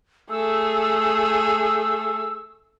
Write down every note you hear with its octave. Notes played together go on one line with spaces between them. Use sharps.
A3 G#4 E6